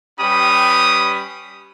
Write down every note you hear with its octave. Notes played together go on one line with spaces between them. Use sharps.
G3 C#4 G4 B4 B5 D#6